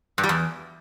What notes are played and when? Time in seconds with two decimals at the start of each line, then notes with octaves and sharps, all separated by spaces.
0.18 G2
0.24 G3
0.29 E2